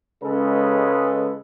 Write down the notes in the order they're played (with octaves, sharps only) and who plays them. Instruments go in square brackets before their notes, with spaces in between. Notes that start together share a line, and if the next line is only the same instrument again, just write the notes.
[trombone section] C#2 C#3 G#3 A4 B4